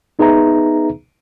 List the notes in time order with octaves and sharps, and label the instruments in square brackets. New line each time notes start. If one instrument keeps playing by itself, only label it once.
[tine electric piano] B3 D#4 G#4 B4 E5 A#5